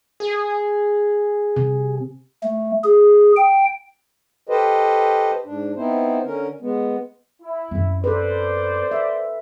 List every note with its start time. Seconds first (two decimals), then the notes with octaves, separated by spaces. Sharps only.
0.20 G#4
1.56 C3
2.43 A3
2.84 G#4
3.36 G5
4.49 G4 A4 B4 C5 D#5
5.45 G#2 D4
5.76 B3 C4 D#4 E4 C5
6.24 D3 C#4 A#4
6.61 G#3 B3
7.42 E4
7.71 F#2 C4
8.04 A4 B4 C5 D5
8.91 E5